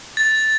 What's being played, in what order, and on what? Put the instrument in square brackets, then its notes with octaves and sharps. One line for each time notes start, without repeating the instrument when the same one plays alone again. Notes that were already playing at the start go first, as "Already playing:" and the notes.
[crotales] A6